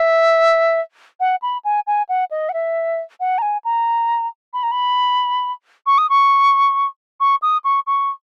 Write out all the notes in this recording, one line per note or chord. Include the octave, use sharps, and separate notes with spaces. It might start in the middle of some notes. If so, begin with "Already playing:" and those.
Already playing: E5
F#5
B5
G#5
G#5
F#5
D#5
F#5
E5
F#5
A#5
G#5
A#5
B5
A#5
B5
C#6
D#6
C#6
C#6
D#6
C#6
C#6